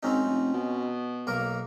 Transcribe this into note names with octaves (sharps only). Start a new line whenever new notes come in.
G#1 C4 C#4 D#4
F1
B2
B1 A#3 A#4